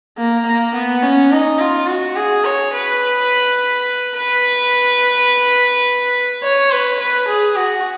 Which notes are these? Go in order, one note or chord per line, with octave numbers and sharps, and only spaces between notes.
A#3
A#3
B3
C#4
D#4
F4
F#4
G#4
C#5
B4
B4
C#5
B4
B4
G#4
F#4